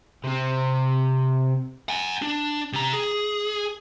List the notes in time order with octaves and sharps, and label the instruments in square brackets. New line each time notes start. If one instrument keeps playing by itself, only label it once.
[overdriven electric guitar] C3 C4
[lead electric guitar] F#5 G#5
D4
C3 A#5
G#4